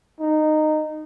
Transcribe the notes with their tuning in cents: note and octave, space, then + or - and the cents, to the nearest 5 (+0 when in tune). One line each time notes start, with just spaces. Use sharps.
D#4 -15